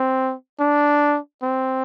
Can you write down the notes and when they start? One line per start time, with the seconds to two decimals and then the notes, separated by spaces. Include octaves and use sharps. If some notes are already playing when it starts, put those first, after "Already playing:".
Already playing: C4
0.60 D4
1.43 C4